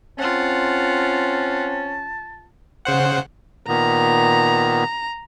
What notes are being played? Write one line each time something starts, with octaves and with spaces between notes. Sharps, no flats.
C4 C#4 F4 F#5 A5
C#3 C5 F#5
A#2 D#3 B3 A#5